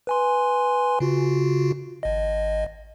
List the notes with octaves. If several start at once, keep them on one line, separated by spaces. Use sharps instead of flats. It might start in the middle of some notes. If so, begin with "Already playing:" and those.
B4 G#5 C6
C#3 F4 F#4
G#1 D#5